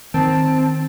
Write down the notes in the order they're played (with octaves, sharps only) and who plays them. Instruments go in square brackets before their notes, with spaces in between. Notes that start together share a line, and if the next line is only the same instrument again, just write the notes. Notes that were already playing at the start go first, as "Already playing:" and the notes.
[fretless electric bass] D#3 [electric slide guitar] C4 [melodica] A5